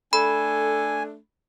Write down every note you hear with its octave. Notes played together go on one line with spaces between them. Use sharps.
A3 D4 A4 G#5 B5